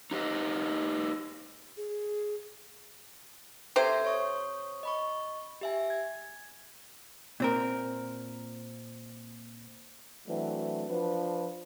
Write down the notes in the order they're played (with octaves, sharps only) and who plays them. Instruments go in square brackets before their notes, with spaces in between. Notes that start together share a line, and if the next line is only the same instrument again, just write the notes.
[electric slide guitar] D#4 G4 B4 D#5
[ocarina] G#4
[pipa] C3 C5 [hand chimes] A4 E5 G#6
[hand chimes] C#5 C#6 D#6
D#5 B5 C#6
G4 E5 G#5
G#6
[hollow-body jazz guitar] A#2 C4 A#4
[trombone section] E3 F#3 A3 C4 D4
F3 D4 B4